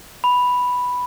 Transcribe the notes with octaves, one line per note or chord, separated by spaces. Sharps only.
B5